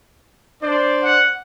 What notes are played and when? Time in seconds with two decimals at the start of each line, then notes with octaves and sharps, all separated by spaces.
0.62 D4 C5 D5
1.04 F#5